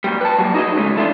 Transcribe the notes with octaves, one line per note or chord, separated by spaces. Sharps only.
G2 A#2 G3
B4 A5
F#3 G3 A#3
D#4 F#4 G#4 D#5
C#3 G#3 A3 C#4
E3 A3 D4 F4